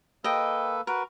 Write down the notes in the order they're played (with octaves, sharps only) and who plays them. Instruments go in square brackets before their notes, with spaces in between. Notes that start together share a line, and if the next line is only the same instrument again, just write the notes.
[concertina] A#3 A4 B4 [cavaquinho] D#5 G5
[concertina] F#4 B4 [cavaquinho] A#4